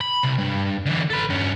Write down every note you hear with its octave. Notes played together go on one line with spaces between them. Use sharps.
B5
C2
G2
D3 E3
A4 B4
G2 C#4